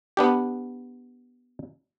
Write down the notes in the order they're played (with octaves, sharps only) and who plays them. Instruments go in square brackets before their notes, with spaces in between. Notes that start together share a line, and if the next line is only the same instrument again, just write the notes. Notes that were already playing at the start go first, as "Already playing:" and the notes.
[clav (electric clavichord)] B3 D4 G4